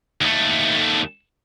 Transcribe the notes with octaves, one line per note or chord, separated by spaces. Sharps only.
D#2 A3